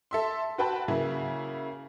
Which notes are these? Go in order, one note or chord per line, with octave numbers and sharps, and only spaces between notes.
A4 E5 C6
F#4 B4 G5 A5 B5
C#3 F#3 A#3 E4